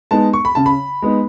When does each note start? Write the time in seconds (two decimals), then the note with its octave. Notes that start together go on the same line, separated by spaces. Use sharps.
0.11 G#3 B3 D#4 A5
0.33 C#6
0.45 B5
0.55 C#3 A5
0.66 B5
1.02 G#3 B3 D#4